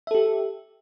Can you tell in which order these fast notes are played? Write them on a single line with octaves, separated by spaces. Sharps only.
E5 A4 G4